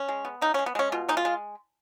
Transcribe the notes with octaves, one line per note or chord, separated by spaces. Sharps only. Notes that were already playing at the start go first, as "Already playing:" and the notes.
Already playing: C#4
G#3
B3
C#3 D#4
C#4
G#3
B3
G#3 C#4
B2 F4
G#3 D#4
F4
G#3